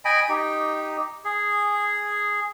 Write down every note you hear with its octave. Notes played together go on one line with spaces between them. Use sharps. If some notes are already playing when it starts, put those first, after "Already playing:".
D#5 G5 G#5 B5
D#4 G4
G#4